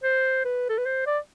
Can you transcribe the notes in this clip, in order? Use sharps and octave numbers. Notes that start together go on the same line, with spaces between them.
C5
B4
A4
B4
C5
D5